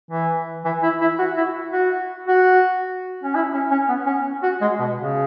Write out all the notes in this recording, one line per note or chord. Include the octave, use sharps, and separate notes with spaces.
E3
E3
E4
E4
F#4
E4
F#4
F#4
C#4
E4
C#4
C#4
B3
C#4
F#4
G#3
B2
C#3